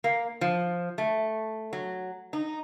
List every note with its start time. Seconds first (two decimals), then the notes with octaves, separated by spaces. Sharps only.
0.04 A#3
0.41 F3
0.98 A3
1.73 F#3
2.33 D#4